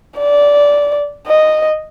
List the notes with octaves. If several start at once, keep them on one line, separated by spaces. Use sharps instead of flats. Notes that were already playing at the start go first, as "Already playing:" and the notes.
D5
D#5